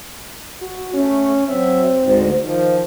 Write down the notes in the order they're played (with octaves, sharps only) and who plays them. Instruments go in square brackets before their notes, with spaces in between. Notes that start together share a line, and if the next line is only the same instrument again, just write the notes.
[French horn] F#4
[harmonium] A3 [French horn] C#4
[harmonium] F#3 E5 [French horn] C4
[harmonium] D2 G#2
[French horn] D#3 [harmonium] F3